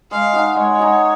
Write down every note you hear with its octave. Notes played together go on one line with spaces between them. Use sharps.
G#3 F5
D#4 F#4
G#3 C#5
D#4 F#4